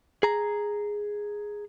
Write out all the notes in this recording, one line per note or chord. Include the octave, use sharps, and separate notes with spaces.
G#4 A#5